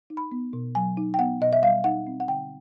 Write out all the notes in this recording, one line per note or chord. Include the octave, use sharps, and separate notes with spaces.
D#4
B5
B3
B2
F#3 G#5
D#4
G5
B3 F#5
B2 D#5
E5
G3 F5
D#4 F#5
C4
F#5
D3 G5